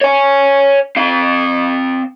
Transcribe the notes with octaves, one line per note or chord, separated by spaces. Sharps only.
C#5 G#5
C4 F5